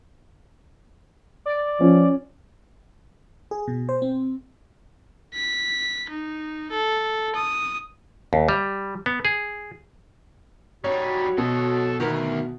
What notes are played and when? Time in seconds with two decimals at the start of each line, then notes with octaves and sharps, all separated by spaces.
1.46 D5
1.81 F3 C#4
3.51 G#4
3.68 B2
3.89 C5
4.02 C4
5.34 B6
6.09 D#4
6.71 A4
7.35 D#6
8.33 D#2
8.49 G3
9.06 B3
9.25 G#4
10.84 G3 D#4 F#4 C#5
11.38 B2 A4 D#5
12.00 D2 D#3 B3 A#4